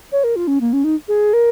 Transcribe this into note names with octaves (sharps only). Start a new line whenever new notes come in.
C#5
A#4
F4
C#4
A#3
C#4
D#4
G#4
A#4